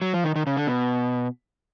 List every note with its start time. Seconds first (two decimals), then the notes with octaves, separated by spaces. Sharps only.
0.02 F#3
0.14 F3
0.24 D#3
0.36 D#3
0.47 C#3
0.57 D3
0.67 B2